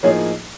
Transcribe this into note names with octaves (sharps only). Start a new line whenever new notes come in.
A2 F3 A#3 D#4 G#4 C#5